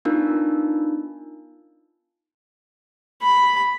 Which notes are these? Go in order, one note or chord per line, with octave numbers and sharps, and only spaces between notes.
B3 D4 D#4 F4 A#4
B5